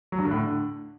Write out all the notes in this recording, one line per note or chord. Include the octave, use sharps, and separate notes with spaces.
F#3
G2
D3
A2
D3